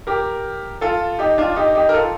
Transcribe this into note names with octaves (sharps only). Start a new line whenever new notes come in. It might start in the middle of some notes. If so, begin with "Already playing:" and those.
G4 A#4
F4 A4
D#4 G4
D4 F4
D#4 G4
D#4 G4
A#4
F4 A4